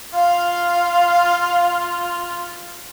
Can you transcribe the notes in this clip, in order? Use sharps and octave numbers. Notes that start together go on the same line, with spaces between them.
F4 F5